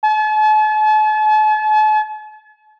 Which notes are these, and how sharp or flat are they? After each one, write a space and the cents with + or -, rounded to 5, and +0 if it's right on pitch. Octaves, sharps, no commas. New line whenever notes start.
A5 -45